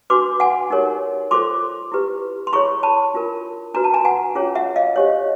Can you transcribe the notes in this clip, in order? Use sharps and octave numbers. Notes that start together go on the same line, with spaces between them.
D4 F#4 B4 C6 D6
F#5 G#5
D#4 G4 A#4 C#5
F4 A4 C5 C6 D6
E4 G4 B4
C6
E4 G#4 C#5 B5 C#6
A5 B5
D4 F4 A#4
D4 F#4 B4 A#5
A5
G#5 A#5
F#5 G#5
C#4 F4 G#4 C#5
E5 F#5
D#5 F5
D4 G4 C5 C#5 D#5